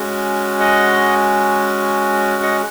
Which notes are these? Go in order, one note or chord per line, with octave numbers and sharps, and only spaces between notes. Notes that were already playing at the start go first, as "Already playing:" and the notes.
Already playing: G#3 C#4 F#4
D#5 F#5
D#5 F#5